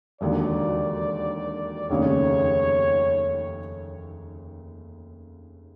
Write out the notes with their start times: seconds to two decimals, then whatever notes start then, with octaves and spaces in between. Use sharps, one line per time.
0.21 E1 D#2 D3 F#3 D5
1.89 F1 D#2 C#3 C#5